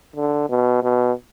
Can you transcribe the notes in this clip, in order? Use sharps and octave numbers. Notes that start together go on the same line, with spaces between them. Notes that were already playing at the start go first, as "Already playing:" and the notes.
D3
B2
B2